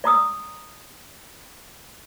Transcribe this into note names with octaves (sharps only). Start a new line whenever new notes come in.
D5 A#5 D#6 E6